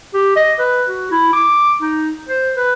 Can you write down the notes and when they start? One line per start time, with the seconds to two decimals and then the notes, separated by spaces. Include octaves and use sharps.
0.15 G4
0.36 D#5
0.59 B4
0.87 F#4
1.11 E4
1.33 D6
1.82 D#4
2.29 C5
2.56 B4